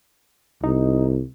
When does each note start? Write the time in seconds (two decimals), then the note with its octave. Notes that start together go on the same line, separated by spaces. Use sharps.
0.64 C2 D#4